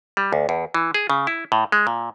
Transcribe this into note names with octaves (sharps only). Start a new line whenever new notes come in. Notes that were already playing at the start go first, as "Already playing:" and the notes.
G3
D2
E2
E3
G#4
C#3
E4
A2
G#3
A#2